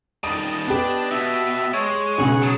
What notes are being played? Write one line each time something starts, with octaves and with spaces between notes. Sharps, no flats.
D#3 G3 D#5 A5 D#6
B3 D4 G4 D5
B2 E5
G#3 C#5
B1 C#3 G#4 F#5 C#6
F#3 G#4 A5